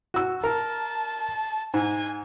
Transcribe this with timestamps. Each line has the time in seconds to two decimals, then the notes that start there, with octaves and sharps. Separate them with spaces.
0.14 F#4 E6
0.44 A#4 A5
1.74 G#2 G#5